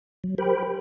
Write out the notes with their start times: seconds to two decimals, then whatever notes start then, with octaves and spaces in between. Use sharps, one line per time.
0.24 F#3
0.38 G4 A#4 C5 G5 B5